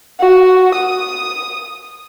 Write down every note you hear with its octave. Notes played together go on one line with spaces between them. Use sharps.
F#4
D#6